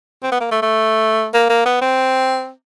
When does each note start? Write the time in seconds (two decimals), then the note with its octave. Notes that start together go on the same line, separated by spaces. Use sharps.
0.23 C4
0.32 B3
0.40 A#3
0.51 A3
0.62 A3
1.34 A#3
1.49 A#3
1.65 B3
1.81 C4